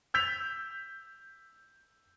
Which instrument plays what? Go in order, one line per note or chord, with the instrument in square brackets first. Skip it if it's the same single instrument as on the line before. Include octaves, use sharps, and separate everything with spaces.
[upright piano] E6 G6 B6 F7